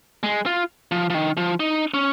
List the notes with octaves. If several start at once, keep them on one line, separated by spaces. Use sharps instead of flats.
G#3
F4
F3
F3
D#3
F3
D#4
C#4